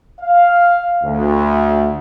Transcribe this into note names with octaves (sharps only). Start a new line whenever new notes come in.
F5
D2